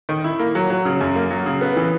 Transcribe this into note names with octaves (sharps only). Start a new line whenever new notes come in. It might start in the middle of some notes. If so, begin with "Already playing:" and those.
D#3
E4
A#3
F#3
F#3
C#3
F#2
A#3
F#3
C#3
B3
E3